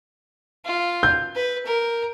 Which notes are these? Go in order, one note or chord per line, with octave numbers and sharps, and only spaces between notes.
F4
G6
B4
A#4